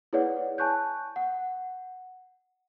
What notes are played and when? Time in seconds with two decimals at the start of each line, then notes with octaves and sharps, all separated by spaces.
0.13 E4 G#4 B4 C#5 D5 F#5
0.58 G#5 A5 C#6 F#6 G6
1.16 F#5